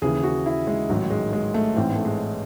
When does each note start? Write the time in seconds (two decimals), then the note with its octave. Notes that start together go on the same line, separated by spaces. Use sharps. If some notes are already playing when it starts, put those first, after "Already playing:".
0.02 D#2 C#3 E3 G#4
0.23 F#4
0.46 E4
0.67 G#3
0.89 A1 G#2 D#3 F#3
1.10 G#3
1.33 G#3
1.54 A3
1.76 A1 G#2 E3 C4
1.95 A3
2.05 G#3